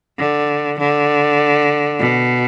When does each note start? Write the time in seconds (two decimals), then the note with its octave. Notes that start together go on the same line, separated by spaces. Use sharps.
0.18 D3
0.79 D3
1.99 B2